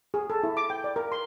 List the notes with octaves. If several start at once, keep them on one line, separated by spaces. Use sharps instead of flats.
G#4
A4
E4
D6
G5
D5
A#4
C6